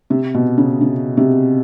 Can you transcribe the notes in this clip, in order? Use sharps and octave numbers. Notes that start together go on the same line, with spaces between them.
C3
B2
C#3
C#3
C3